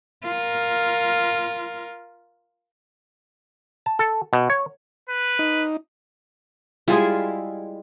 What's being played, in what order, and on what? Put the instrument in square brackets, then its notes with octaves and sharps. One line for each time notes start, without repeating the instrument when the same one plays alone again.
[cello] F4 A#4
[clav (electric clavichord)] A5
A4
B2
C#5
[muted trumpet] B4
[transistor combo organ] D#4
[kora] G3 G#3 G#4 [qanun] E4 F4 E5